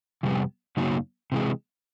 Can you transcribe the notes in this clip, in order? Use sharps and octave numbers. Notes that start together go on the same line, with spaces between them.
F2 C3 G3 B3
F#2 C#3 F#3 A#3 D#4
C3 E3 G#3